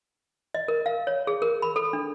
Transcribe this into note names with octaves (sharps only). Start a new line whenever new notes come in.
D#5
A#4
F5
C#5
G#4
A#4
B5
A4
D4